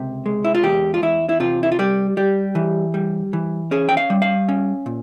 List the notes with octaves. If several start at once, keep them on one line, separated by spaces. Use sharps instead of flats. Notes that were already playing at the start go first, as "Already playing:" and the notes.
Already playing: C#2 C3
G#3
E4
F4
E2 G4
F4
E2 E4
E4
C3 F4
E4
F4
G3 G4
G3 G4
E3
G3
E3
C#4 G#4
G5
F5
G3
F5
C#4
A#2